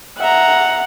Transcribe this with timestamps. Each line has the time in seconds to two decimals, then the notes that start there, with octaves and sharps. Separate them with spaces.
0.20 E5 F#5 A#5